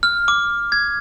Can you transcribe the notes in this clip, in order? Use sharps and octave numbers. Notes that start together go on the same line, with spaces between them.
F6
D6
G#6